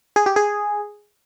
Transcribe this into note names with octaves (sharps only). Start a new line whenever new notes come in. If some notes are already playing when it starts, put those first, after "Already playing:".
G#4
G4
G#4